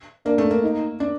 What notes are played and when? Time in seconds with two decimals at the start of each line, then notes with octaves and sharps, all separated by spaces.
0.26 A#3 D4
0.38 A3
0.51 A#3
0.63 D#4
1.00 D4